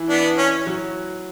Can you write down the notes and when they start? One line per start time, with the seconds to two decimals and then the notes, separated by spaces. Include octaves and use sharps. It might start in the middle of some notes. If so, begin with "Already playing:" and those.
Already playing: E3 E4
0.09 B3 D4
0.38 C#4
0.66 F#3 F#4